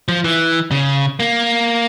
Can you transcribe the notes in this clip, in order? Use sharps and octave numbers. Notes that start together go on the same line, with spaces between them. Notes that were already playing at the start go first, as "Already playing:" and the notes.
F3
E3
C#3
A#3